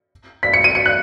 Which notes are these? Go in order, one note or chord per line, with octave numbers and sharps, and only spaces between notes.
B6
C#7
D#7
C#7
F#6